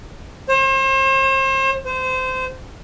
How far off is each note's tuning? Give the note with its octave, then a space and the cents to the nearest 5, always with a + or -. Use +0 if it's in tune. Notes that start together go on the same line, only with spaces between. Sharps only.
C5 +40
C5 -25